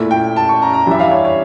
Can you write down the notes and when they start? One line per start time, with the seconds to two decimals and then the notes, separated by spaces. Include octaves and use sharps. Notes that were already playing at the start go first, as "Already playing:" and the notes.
Already playing: A#2 A3 E4
0.11 G5
0.36 A5
0.49 C#6
0.62 A#5
0.73 A#5
0.87 G2 E3 G3 E5
1.00 F5
1.12 C#5
1.25 C#5